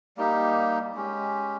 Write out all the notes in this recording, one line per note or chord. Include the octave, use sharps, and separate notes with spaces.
G3 A#3 D#4 G4
G#3 C#4 G4